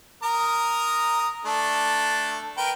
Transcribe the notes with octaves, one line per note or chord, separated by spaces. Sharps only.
A#4 A#5 D#6
A3 D4 A4
A#4 B4 G5